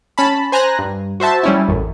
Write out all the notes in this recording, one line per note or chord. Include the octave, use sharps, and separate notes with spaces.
C#4 A5 B5
C5 G#5 A#5 F#6 A#6
G2
F#4 C5 E5 A5
G3 C#4 E4
A1 F#2